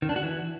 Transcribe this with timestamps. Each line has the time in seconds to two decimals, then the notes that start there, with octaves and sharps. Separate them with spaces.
0.02 D#3
0.09 D4
0.16 F#4
0.23 E3